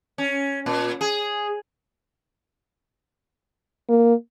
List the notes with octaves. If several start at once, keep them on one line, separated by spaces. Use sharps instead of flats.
C#4
A#2
G#4
A#3